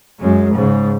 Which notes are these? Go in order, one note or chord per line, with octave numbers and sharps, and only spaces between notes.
F#2 G#3
G#2 C#3